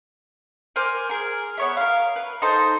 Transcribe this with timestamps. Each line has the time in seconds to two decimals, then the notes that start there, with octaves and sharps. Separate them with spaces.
0.76 A#4 C5 G#5 D6
1.10 G#4 A#4
1.58 B3 C#5 E5
1.77 A#4 F5
2.16 B4
2.42 D#4 A4 C5 A#5